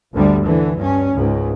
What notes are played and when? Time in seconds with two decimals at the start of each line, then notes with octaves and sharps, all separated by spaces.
0.14 G1 D2 D3 G3
0.43 D3 E3
0.76 G2 C#4
1.13 C#2 G#2